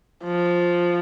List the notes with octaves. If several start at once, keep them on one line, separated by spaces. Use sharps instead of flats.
F3